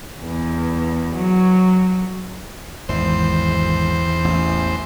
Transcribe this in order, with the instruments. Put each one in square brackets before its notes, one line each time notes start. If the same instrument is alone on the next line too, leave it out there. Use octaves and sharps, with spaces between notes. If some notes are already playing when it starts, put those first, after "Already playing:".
[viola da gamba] E2
F#3
[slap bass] G#1 [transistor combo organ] E2 C5
[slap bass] A1